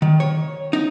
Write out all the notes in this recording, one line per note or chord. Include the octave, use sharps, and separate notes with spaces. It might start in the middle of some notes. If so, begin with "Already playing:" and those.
D#3
C#5
D#4